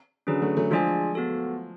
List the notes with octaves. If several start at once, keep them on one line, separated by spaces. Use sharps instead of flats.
D3 F#3 C#4 G#4 B4
F#3 A3
F#3 A3
F3 G#3 D4 F4 G#4 D5 G#5
B3 F#4 A4